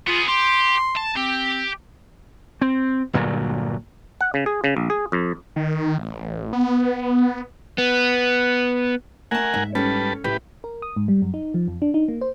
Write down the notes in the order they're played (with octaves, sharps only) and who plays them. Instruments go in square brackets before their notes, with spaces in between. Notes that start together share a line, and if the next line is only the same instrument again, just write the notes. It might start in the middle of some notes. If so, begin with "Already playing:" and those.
[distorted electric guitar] B3 G#4 [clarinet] F4
[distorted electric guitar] G4 [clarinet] C6
[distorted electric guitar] A5
[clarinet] C4 [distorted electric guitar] G4
[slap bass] C4
G1 D2 A#2 F#3
[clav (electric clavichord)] F#5
C#3
G#4
C#3
A#1
G#4
F2
[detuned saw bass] D#3
A1
B3
[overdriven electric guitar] B3
[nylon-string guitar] A3 A5 [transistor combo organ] A#4 F#5 G#5
[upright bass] G#2 [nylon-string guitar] E5
[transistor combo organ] G3 B4 A5 [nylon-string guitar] C#4 A4
[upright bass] A2 [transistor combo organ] G4 B4
[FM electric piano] A#4
D#6
G#2
G3
F#2
D#4
F3
F2
D4
D#4
A#3
C5